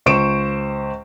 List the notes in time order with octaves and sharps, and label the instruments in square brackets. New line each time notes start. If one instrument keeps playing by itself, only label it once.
[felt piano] C#2 C5 C#6 D7 E7